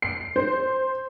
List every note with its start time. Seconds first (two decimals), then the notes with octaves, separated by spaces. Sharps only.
0.02 C7
0.36 C5